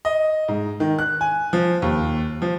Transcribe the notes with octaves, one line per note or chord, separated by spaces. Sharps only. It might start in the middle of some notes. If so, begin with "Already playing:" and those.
D#5
G#2
D#3
F#6
G#5
F3
D#2
F3